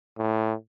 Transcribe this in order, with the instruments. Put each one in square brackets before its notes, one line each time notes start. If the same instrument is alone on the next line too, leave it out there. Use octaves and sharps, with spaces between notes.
[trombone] A2